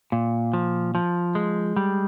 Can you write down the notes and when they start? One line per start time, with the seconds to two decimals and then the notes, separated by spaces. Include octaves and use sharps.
0.12 A#2
0.54 F3
0.95 F3
1.35 G#3
1.76 G3